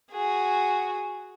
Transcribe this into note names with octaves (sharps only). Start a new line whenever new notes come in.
F#4 G#4